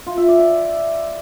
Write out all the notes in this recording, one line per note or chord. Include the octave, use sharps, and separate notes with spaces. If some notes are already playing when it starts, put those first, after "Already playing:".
F4
E5
D5
D5